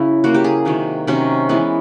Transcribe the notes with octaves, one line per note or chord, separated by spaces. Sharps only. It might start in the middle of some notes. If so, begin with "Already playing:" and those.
Already playing: C#3 F#3 C#4 E4
C#3 F#3 A#3 F#4
G4
G#4
C3 D#3 F#3
C3 D#3 F#3 C#4
E3 G#3 B3